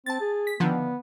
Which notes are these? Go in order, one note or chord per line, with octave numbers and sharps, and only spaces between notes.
C4 A5 A6
G#4
B6
D3 D#3 F3 B3